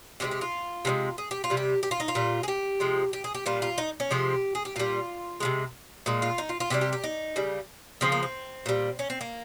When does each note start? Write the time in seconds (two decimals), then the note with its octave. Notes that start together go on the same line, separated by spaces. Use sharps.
0.20 C3 F3 G#3 G4
0.31 G4
0.41 F4
0.85 C3 F3 G#3
1.18 G#4
1.31 G4
1.44 F4
1.50 C3 G3
1.57 G4
1.83 G4
1.91 F4
2.00 D#4
2.08 F4
2.15 A#2 G3
2.43 G#4
2.48 G4
2.80 C3 F3 G#3
3.13 G4
3.24 G#4
3.34 G4
3.46 A#2 G3 F4
3.62 F4
3.78 D#4
4.00 C#4
4.11 C3 F3 G#3 G4
4.55 G#4
4.65 G4
4.76 A#2 G3 F4
5.40 C3 F3 G#3
6.06 A#2 G#3
6.22 F4
6.38 D#4
6.49 F4
6.60 F4
6.70 C3 D#3 G3 G4
6.81 G4
6.93 G4
7.04 D#4
7.36 C#3 G3
8.01 C#3 F3 G#3 C4
8.12 A#3
8.23 C4
8.66 A#2 G3
8.99 C#4
9.10 C4
9.21 A#3